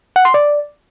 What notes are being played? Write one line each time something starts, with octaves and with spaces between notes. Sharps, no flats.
F#5
C6
D5